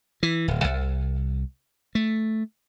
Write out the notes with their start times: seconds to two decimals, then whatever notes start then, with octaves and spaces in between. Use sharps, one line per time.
0.23 E3
0.48 D1
0.64 C2
1.95 A3